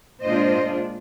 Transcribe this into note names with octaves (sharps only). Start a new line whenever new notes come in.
A#2 G#3 D4 F4 C5 D#5